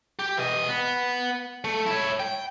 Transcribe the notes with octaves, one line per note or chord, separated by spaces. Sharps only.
G4
E3 D#5
B3
A3
E4 C#5
G5